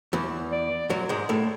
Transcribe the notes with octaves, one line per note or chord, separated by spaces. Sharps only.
E2 E3
D5
F#2 F#3
G#2 G#3
A2 A3